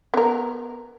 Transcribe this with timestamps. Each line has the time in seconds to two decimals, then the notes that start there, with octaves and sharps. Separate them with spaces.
0.14 B3 A#4